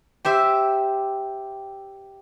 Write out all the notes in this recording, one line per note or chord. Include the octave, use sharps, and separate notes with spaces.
G4 C5 E5